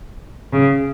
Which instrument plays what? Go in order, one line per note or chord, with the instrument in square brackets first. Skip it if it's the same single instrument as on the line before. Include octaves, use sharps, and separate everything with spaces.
[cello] C#3